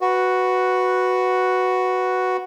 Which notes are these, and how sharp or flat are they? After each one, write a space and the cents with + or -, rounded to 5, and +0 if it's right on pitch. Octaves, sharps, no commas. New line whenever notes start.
F#4 +0 B4 +0